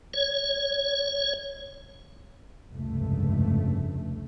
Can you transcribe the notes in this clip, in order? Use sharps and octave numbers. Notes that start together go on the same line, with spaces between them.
C#5
F1 C#2 G2 A3